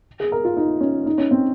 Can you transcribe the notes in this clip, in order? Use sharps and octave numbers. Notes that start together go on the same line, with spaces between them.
G#4
A#4
F4
D#4
C#4
D#4
C#4
C4